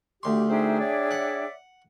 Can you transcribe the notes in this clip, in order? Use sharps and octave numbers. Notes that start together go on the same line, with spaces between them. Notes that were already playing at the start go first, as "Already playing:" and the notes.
D2 G4 C6
D4 D#4 G#4 C5 E5 G5
C#5 D5 E5
F#5